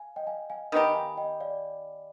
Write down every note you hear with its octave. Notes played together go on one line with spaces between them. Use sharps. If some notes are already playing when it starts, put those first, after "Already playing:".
Already playing: F5 G#5
D#5 G5
F5 G#5
F5 G#5
D#3 B3 D#4 G4 G5 B5
F5 G#5
D#5 G5
D5 F5